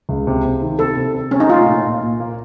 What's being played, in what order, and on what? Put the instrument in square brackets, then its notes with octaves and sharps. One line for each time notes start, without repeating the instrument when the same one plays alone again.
[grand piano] C#2
C3
C3
D#3
[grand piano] C3 [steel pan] A4
[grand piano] C3
C4
[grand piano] C3 [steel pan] C#4
[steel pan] D#4
[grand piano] A3 [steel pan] F4
[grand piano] A#2
A#2
A#2
A#3